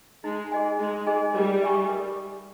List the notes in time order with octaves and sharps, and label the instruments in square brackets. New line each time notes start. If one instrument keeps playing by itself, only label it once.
[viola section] G#3 [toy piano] D#4
[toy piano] G#4 D#5 G#5
[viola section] G#3 [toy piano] D#4
[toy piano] G#4 D#5 G#5
[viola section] G3 [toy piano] A#4
[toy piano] E5 G#5 C#6
A#4